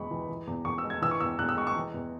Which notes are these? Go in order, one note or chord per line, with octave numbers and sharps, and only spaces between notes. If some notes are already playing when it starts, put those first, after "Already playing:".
Already playing: E2 G#3 B5 C#6
E3
E3
E2
E2 C#6
E6
G#3
G#6
E3 E6
C#6
E2 E6
E2 F#6
E6
G#3 C#6
C#6
E3
E2